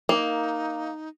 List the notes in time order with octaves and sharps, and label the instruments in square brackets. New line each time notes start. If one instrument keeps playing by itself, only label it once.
[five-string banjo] A#3 [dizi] D#4